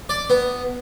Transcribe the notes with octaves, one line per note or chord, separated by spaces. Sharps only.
D5
B3